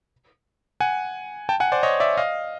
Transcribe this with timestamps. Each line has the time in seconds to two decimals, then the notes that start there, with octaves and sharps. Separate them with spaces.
0.80 F#5 G#5
1.49 G5 A5
1.60 F#5 G#5
1.72 C5 D5
1.83 C#5 D#5
2.00 D5 E5
2.17 D#5 F5